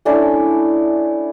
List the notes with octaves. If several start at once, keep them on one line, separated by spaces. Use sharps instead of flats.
A3 C#4 D4 E4